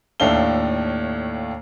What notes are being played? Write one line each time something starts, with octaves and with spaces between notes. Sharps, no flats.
D#2 A2 A3 D4 F5 G7